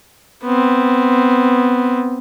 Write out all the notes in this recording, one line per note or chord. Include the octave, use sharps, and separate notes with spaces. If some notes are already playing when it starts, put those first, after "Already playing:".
B3 C4